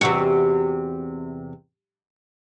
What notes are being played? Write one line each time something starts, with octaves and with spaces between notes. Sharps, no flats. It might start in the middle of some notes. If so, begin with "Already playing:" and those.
E2 C3 F#4